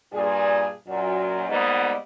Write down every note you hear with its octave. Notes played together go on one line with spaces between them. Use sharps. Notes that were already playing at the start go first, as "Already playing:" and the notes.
G2 A#2 G#4
F#2 A#2 F#3
G#2 G3 A#3 B3